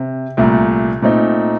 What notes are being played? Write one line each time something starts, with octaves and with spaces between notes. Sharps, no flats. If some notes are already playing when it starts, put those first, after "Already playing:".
Already playing: C3
C2 A#2 A3
A#2 A3 C4 D#4